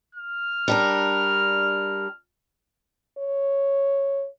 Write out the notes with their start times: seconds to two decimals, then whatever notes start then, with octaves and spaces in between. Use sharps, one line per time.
0.15 F6
0.68 G3 D4 A#4
3.18 C#5